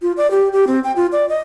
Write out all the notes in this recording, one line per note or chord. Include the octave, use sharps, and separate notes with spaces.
F4
D5
G4
G4
C4
G5
F4
D5
D#5